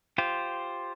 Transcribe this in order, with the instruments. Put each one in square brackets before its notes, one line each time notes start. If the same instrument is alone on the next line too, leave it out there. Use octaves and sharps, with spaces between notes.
[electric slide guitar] F4 G4 C5